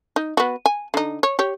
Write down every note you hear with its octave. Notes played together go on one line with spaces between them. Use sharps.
D#4
B3 F#4
G#5
D3 D#4
C#5
G4 C#5